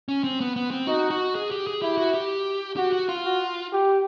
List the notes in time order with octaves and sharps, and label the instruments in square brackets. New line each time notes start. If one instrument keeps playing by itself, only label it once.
[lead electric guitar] C#4
C4
B3
B3
C4
[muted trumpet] D#4 [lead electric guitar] F#4
[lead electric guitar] F#4
G#4
G4
G#4
[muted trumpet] E4 [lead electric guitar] G4
[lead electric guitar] F#4
G4
[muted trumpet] F#4 [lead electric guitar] G4
[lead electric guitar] F#4
F4
[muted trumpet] F#4
G4